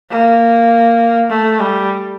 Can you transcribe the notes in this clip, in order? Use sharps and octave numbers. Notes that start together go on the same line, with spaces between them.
A#3
A3
G3